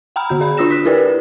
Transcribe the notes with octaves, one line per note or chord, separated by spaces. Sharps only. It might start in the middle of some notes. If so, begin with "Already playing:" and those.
F#5 G5 A#5 B5 F6
D3 F#4 G6
G#4 D5 A#5 B5
D4 F4 D#6 E6 A#6 E7
F#6 B6
E4 G4 A#4 B4 D5